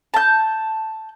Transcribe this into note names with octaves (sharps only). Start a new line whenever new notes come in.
A5 G6